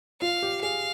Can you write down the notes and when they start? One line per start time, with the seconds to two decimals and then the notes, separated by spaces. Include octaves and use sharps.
0.22 F4 F5
0.43 G4
0.62 G#4 F5